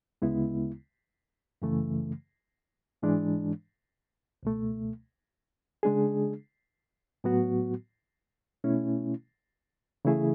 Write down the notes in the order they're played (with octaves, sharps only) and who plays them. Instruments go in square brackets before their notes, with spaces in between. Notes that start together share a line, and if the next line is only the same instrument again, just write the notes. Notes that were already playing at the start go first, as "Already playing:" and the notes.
[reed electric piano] D2 C#3 G#3 B3 E4
F#2 C#3 E3 A3
G#2 E3 G#3 D4
C#2 B2 A3
C#3 G#3 D4 G#4
A2 F#3 B3 F#4
B2 A3 C#4 E4
C#3 E3 A3 E4 G#4